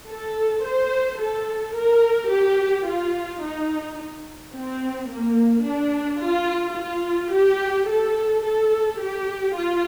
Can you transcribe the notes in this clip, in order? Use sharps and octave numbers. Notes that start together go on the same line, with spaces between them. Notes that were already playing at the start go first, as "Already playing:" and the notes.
A4
C5
A4
A#4
G4
F4
D#4
C4
A#3
D4
F4
F4
G4
A4
A4
G4
F4